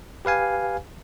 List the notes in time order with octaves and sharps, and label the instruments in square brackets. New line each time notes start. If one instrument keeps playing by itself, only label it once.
[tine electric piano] G4 B4 F5 G#5